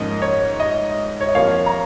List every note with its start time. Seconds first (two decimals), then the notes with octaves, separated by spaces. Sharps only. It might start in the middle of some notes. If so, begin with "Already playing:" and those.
Already playing: G#2 F3 A#3 C#4 D#5
0.22 C#5
0.60 D#5
1.21 C#5
1.28 D#5
1.35 F2 F3 A#3 C#5 F5
1.66 A#5